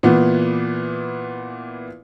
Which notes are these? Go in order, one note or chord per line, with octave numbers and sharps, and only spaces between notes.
A#2 E3 B3